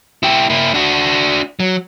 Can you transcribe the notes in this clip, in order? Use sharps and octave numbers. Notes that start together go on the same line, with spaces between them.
E4 G4
A#3 E4
D4 F#4
F#3